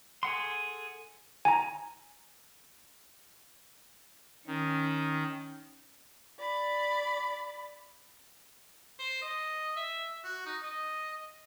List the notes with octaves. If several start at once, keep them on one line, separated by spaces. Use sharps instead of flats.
G#4 A4 F#5 C6
G#5 A#5
D#3 C#4
D5 B5
C5
D#5
E5
F#4
D#4
D#5